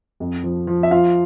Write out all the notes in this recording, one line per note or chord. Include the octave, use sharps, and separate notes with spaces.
F2
F3
F3
E5
F3 F4 F5